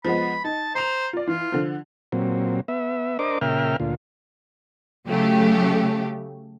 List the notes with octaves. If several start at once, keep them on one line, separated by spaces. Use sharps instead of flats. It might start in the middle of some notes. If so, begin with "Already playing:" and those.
F3 G#3 B3 B5
D#4 A5
C5 A#5 F7
F4 D5
E3 F4
D3 F3
A#2 F#3 C4
B3 E5
D4 A#4 C5 D#5 D6
A#2 C#3 A#4 E5 G5 F6
D2 A#2 F4
C#3 F#3 A3 G4